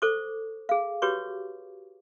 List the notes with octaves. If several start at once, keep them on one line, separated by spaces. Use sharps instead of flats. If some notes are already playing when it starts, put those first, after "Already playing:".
A4 C5 C#6 D6
G#4 F5
F#4 G4 B4 C#5 C#6 D6